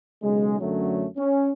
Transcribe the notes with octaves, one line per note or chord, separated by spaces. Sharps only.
B1 C#3 G#3
F#2 D3 F#3 A3 C#4
C#4